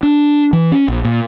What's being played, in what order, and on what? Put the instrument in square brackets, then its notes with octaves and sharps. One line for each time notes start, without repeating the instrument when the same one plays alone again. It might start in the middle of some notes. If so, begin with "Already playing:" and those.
[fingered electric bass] D4
E3
C#4
A#1
A#2